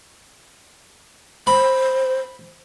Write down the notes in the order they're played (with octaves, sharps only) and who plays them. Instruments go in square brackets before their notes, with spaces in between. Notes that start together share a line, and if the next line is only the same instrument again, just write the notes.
[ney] C5 [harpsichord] B5